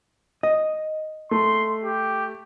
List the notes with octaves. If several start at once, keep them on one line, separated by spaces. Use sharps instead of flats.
D#5
A3 C6
G4